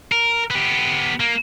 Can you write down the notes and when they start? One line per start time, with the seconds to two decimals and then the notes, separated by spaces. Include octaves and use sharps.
0.12 A#4
0.50 B3 G4
1.20 A#3